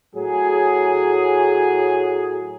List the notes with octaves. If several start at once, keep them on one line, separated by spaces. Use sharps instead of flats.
A2 F#3 G#4